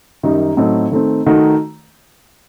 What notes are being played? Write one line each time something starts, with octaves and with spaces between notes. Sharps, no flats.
F#2 D#3 G3 D#4
A2 F#3 C4 D#4 A4
D#3 A3 C4
D#3 A3 D#4 F#4